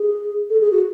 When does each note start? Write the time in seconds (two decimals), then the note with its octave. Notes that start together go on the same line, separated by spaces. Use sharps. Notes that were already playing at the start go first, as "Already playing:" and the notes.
Already playing: G#4
0.50 A4
0.61 G#4
0.71 F#4